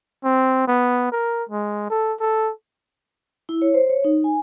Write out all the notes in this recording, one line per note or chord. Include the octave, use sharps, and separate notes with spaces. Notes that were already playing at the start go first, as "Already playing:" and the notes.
C4
B3
A#4
G#3
A4
A4
E4
C#5
C5
C#5
D#4
G#5